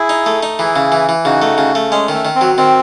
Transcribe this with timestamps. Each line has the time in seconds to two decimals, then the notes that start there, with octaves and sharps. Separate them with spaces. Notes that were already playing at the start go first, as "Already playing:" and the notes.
Already playing: E4 G#4
0.09 D#4
0.26 A3
0.43 D#4
0.59 E3 E4 G#4
0.76 C#3
0.92 E3
1.09 E3
1.25 C#3 D#4 F#4
1.42 A3
1.58 C#3
1.75 A3
1.91 G#3 C#4
2.09 D#3
2.14 A3
2.25 D#3
2.35 C4
2.41 F#3
2.57 D#3 C4